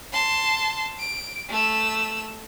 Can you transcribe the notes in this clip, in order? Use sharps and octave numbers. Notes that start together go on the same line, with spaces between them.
A5 C6
D7
A3 E6